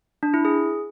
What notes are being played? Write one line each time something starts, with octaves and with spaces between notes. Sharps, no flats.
D4
E4
G#4